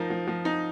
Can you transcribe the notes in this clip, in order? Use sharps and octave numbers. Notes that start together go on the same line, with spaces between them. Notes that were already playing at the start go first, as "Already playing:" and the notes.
Already playing: F3 D#4 A#4
F3
F3
D#4